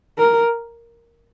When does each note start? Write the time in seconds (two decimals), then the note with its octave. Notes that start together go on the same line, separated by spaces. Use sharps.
0.18 A#4